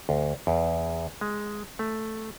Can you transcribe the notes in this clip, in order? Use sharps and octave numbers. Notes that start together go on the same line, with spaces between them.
D2
E2
G#3
A3